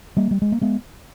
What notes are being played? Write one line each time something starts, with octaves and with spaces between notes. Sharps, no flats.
G3 A#3
G3
G#3
A#3
G#3 B3